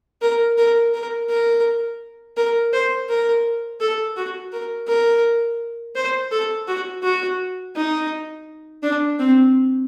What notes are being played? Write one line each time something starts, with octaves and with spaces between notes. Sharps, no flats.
A#4
A#4
A#4
A#4
A#4
C5
A#4
A4
F#4
A#4
A#4
C5
A4
F#4
F#4
D#4
D4
C4